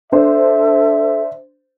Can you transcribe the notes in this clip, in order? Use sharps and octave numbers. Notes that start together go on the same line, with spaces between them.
D4 A4 C5 E5